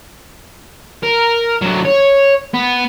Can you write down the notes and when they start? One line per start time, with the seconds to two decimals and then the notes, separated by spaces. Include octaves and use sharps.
1.03 A#4
1.61 D3 F#3
1.85 C#5
2.54 B3